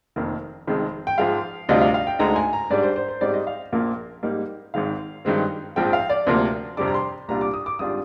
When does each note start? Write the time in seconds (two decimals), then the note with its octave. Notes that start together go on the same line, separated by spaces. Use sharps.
0.16 F1 F2 D#3 A#3
0.67 F1 F2 D#3 G#3
1.07 G5
1.18 G#2 F3 G#3 F5
1.69 D2 C3 G3 D4 F4 D#5
1.81 F5
1.94 F5
2.07 G5
2.19 D2 D3 G#3 D#4 A#5
2.36 G#5
2.53 A#5
2.70 G#2 G3 D4 D5
2.83 C5
2.96 C5
3.08 C5
3.21 G#2 G3 C4 D#4 D5
3.34 D#5
3.47 F5
3.72 A#1 A#2 F3 A#3 F4
4.23 G#2 G3 A#3 D#4
4.74 G#1 G#2 D#3 G#3 F5
5.25 G2 D#3 G#3 C4
5.76 A#1 G#2 F3 C4 G5
5.93 F5
6.10 D5
6.27 D2 C3 F3 A#3 C6
6.77 F2 C3 G3 D4 D6
6.88 A#5
6.94 C6
7.28 C2 A#2 G3 D4 F4 A#5
7.41 D6
7.54 D#6
7.66 D6
7.79 G#1 G3 D4 F4 D#6